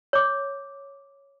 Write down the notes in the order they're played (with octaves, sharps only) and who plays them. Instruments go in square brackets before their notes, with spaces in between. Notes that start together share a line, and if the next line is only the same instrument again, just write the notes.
[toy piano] C#5 D6